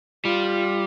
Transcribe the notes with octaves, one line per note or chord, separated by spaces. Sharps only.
G3 F4